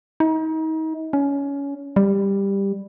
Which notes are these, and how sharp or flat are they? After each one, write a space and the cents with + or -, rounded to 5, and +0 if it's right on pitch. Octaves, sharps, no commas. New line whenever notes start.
D#4 +35
C#4 +20
G3 +10